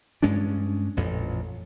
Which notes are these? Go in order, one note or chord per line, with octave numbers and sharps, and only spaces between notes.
G2 G#3 C#4 D4
A1 F2 A#2